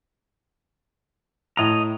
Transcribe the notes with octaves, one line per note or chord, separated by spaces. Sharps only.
A2 D#5 A#5 F7